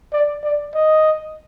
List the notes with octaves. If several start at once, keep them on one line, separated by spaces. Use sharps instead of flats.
D5
D5
D#5